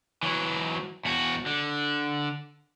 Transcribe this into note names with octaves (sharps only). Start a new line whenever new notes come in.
E3 F#3
E2 F#4
D3